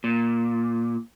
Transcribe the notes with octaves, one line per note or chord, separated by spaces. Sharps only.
A#2